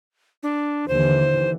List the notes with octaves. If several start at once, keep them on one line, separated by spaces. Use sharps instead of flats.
D4
D#2 D3 E3 C5